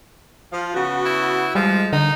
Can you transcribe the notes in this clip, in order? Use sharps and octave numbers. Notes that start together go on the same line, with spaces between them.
F3 F4
C#3 B3 F#4
E4
F3 G3 G#3
D3 D#4